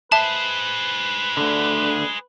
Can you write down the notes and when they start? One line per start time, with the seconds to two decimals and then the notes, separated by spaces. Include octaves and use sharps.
0.12 G#4 B4 C5 E5 A5
1.37 D2 D3